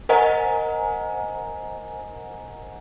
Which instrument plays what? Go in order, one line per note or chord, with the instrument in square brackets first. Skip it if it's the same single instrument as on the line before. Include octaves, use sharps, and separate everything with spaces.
[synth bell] A#4 C5 D#5 F#5 G#5 A#5